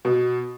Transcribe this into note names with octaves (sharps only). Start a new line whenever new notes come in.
B2